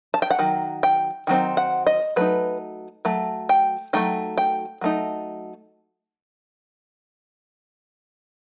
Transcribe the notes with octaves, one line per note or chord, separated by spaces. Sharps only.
A5
G5
F#5
D#3 F#3
G5
D#3 F#3 C4 D#4
F#5
D#5
F#3 A3 D#4 B4
F#3 A3
G5
F#3 A3 D#4 G5
G5
F#3 A3 D#4